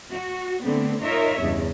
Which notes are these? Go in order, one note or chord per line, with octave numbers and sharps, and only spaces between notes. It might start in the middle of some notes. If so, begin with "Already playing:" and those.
F#4
D3 A3 B3 C4
D#4 F4 A#4 C#5 D#5 E5
E2 G2 C#3